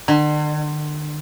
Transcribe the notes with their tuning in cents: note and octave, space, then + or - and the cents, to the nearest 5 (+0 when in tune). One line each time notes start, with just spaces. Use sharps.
D3 +40